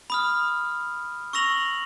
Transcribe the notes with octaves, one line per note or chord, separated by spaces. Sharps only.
B5 D#6 F6
C#6 E6 A#6 F7 F#7